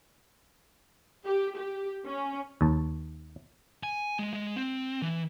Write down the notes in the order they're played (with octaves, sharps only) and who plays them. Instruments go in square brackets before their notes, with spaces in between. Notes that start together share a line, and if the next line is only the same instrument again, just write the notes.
[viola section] G4
G4
C#4
[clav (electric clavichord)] D#2 A5
[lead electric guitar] G#5
G#3
G#3
C4
E3